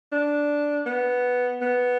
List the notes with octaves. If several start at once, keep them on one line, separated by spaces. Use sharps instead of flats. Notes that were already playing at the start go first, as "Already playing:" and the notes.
D4
B3
B3